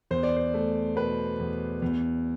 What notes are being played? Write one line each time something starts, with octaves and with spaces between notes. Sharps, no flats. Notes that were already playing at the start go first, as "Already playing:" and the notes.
E2 C5
D5
C5
A3
B2 B4
E2
E2